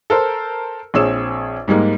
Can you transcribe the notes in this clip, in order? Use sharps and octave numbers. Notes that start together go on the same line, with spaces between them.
A4 A#4 C5
A#1 C4 G#4 C#5 E6 E7
G#2 G3 G#3 A#3